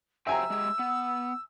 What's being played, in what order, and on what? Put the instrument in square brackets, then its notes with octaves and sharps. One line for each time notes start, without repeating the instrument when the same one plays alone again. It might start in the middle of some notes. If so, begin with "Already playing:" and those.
[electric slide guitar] F#3 C5 G5 [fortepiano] E5 G#5 A#5 [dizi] E6
[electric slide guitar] G#3 G4 G#4
B3